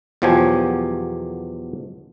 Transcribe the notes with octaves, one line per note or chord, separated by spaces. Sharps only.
E2 B2 F3 F#3 G4 G#5